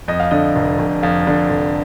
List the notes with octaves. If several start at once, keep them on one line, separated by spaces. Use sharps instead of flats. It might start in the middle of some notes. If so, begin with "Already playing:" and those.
F2 D#5
F5
D3 D#5
F1
F1
F2 F5
D3
F1